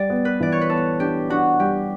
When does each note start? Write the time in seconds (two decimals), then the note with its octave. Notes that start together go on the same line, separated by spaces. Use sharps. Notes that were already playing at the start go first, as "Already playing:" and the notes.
Already playing: G3 D5
0.10 B3
0.25 B4
0.40 E3 D5
0.52 C#5
0.61 B4
0.70 B3 A4
1.00 D4 G4
1.30 D4 F#4
1.60 G3 G4